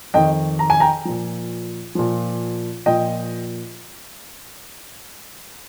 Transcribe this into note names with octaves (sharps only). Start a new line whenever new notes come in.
F2 D#3 D#5 G5
A#5
G#5
G5 A#5
A#2 F3
A#2 F3
A#2 F3 D#5 G5